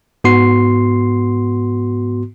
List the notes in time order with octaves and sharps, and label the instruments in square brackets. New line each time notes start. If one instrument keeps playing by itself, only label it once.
[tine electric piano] G#2 B3 F#4 C6 C7